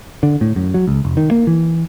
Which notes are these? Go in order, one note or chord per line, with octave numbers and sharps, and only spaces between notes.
D3
A2
F#2
F#3
C#2
F1
D#3
A#3
E3